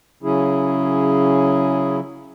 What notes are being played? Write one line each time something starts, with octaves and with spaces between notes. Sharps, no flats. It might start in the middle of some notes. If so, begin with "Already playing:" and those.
C#3 F#3 C#4 E4 G#4